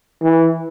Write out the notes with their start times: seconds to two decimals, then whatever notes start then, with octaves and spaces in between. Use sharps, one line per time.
0.22 E3